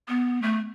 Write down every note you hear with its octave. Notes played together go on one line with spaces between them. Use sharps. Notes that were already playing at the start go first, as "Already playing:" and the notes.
B3
A3